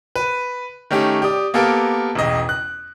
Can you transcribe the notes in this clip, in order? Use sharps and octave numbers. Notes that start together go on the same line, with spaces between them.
B4
D#3 A3 C#4 G4
G4 D5 D#6
A#3 B3 G4 A4 A#4
E1 A1 D#5
F#6